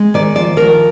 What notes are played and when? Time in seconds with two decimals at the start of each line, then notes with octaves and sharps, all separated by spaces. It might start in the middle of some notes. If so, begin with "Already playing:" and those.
Already playing: G#3
0.14 D#3 D5
0.35 F3 D5
0.57 F3 A#4